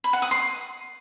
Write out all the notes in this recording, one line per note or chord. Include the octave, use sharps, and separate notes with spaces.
B5
F#5
D#6
C6